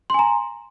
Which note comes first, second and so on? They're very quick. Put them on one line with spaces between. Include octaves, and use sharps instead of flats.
C6 G#5 A#5